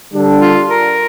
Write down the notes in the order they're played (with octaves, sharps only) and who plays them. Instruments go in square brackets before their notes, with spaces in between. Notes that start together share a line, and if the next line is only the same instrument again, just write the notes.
[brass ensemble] D3 G3 D4 A4
[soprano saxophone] F4
A#4